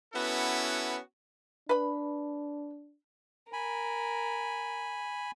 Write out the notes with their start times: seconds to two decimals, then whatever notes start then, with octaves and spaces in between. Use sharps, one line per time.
0.14 B3 C#4 E4 F#4 A4 B4
1.69 D4 B4 B5
3.53 A#4 G#5 B5